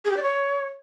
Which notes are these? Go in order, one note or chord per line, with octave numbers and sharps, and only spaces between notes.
G#4
G4
D5
C#5